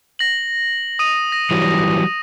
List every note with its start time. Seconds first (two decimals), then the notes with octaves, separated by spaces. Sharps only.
0.19 A#6 F#7
0.99 D#6 D#7
1.32 A#6
1.51 E3 F#3 G3